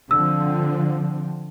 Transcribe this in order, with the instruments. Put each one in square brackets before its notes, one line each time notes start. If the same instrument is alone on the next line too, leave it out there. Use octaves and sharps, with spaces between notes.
[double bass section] D3 F3 C4 [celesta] E6